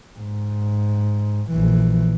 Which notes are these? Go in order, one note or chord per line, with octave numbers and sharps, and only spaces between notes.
G#2
A#1 E3